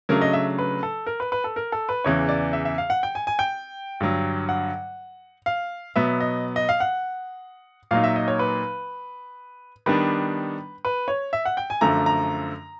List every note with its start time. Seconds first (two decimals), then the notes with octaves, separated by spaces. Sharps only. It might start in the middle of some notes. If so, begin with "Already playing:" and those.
0.09 C#3 F#3 A3 D4 A#4
0.21 D#5
0.33 E5
0.59 B4
0.83 A4
1.07 A#4
1.20 B4
1.32 B4
1.44 A4
1.56 A#4
1.72 A4
1.89 B4
2.04 E2 C#3 E3 C#5
2.29 D5
2.53 E5
2.65 E5
2.78 F5
2.90 F#5
3.03 G5
3.15 G#5
3.27 G#5
3.39 G5
4.00 G2 D3 F#3
4.49 F#5
5.46 F5
5.96 B2 F#3 B3 E5
6.20 D#5
6.56 D#5
6.69 F5
6.80 F#5
7.91 A#2 F#3 A#3 D#4 F5
8.04 E5
8.16 D#5
8.28 C#5
8.39 B4
9.86 D#3 G3 B3 D4 B4
10.85 B4
11.08 C#5
11.33 E5
11.45 F#5
11.57 G5
11.70 G#5
11.81 F#2 D3 F3 A3 A#5
12.06 A#5